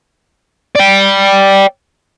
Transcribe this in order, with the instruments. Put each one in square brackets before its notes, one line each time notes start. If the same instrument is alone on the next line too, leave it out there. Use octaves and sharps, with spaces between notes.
[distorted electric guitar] D5 G5